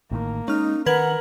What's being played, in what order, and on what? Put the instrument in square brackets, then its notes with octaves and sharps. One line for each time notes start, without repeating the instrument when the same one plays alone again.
[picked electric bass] A1 A2 D#3 [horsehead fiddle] A#3
[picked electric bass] G#3 [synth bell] C#4 F6 [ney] D#4
[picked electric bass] D#3 [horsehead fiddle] A#4 [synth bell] B4 G#6 F#7 [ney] F#5